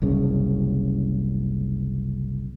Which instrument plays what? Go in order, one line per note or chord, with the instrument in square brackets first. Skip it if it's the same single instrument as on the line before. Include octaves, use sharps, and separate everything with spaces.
[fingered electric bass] F#1 C2 C#3